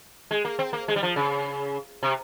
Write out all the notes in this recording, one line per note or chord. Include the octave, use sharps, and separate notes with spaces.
G#3
A#3
C4
A#3
G#3
G3
F3
C#3
C3